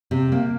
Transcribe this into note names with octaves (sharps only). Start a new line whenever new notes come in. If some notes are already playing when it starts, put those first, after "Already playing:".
C3
A#3